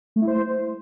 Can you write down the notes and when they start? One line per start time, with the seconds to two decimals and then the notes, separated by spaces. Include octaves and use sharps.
0.16 A3
0.22 E4
0.27 C5